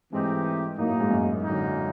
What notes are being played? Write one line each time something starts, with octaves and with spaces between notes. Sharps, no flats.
G#2 E3 A3 C4 D#4 G4
A2 F#3 A#3 D#4
A2
G#2
F#2
D3 F#3 A#3 D#4